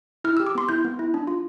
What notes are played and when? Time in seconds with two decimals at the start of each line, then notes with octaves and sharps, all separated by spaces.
0.24 E4 F6
0.37 G4 E6
0.47 D6
0.55 B3 C6
0.69 E4 G6
0.84 B3
0.99 E4
1.14 D4
1.27 F4